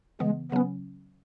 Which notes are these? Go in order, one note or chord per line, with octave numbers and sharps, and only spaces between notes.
C#3 E3 G#3 B3
C#3 F#3 B3 C#4